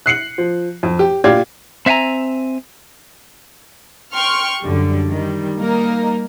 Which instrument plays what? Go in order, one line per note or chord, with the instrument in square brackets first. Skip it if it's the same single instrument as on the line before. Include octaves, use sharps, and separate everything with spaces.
[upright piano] F#6 C7 C#7 F#7
F3
F2
G4
A#2 G4 D5 F5 G#6
[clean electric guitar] C4 E5 F5 G#5 A#5
[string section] G5 C6 C#6 F6
F#2 D3 G3
D#3 G3
G3 A#3 D#4 A#4